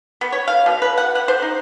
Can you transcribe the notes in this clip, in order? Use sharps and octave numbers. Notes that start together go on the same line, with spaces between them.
B3
C#5
F5
B2
B4
F#5
F#5
C5
D#4